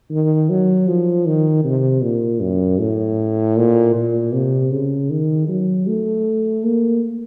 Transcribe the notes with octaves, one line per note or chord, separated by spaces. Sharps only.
D#3
F#3
F3
D#3
C3
A#2
F#2
A2
A#2
A#2
C3
C#3
D#3
F#3
A3
A#3